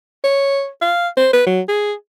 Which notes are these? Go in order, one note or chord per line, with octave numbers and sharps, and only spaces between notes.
C#5
F5
C5
B4
F#3
G#4